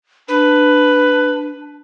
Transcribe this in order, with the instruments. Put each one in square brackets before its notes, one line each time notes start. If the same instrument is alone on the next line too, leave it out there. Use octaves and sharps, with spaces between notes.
[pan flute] D4 [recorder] B4